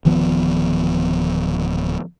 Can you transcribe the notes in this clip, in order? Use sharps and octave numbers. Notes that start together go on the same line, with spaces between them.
D1 D#3 F3 B3